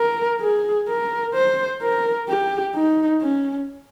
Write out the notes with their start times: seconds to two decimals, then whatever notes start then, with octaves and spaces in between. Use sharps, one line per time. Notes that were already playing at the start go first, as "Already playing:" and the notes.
Already playing: A#4
0.41 G#4
0.88 A#4
1.34 C5
1.82 A#4
2.29 G4
2.75 D#4
3.22 C#4